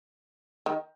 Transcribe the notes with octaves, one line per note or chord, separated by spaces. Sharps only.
D#3